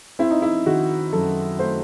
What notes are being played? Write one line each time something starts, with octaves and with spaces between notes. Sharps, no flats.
C4 E4
D#4
E4
D#3 F#4
F#2 A4
A3 C5